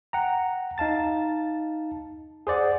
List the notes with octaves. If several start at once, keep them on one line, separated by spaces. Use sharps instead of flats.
F#5 G5 A#5
D#4 F5 A5 A6
G#4 C5 D5 F#5